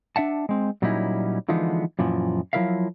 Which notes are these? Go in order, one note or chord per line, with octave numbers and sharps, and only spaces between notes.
D4 E5 F#5 A5
G#3 C4
A#2 F#3 G3 C#4 D#4 E4
D3 E3 F3 G#3 B3 D#4
F#2 A#2 E3 F3
F3 F#3 E4 A#4 E5 F5